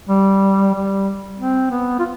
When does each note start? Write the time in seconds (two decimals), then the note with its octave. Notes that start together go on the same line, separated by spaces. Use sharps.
0.09 G3
0.74 G3
1.38 C4
1.70 B3
1.99 F4